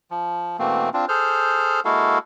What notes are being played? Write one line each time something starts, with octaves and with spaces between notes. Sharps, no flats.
F3
B2 E3 A3 A#3 C4
C4 D4 F4
G#4 A4 C5 F6 G6
G#3 A#3 E4 F#4 A4 F5